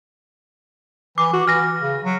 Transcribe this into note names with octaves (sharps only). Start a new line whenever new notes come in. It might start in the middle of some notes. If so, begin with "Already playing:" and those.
E3 D6
F#4
E3 F6 A#6
C#3
F#3